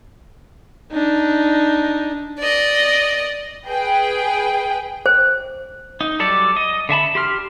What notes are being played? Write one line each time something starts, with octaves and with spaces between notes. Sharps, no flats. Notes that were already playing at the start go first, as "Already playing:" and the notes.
D4 D#4
D5 D#5
G#4 B4 G5
C5
D#4
F#3 G3 A4 D5
D#5
D3 E5 A5 B5
G4 C6 F6